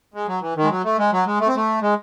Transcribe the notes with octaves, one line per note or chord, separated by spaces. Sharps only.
G#3
F#3
E3
D#3
G#3
F#3
A3
G#3
F#3
G#3
A3
C4
A3
G#3